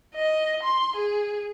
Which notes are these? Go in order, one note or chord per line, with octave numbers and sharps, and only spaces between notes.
D#5
C6
G#4